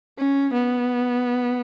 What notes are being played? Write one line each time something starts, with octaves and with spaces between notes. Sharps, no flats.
C#4
B3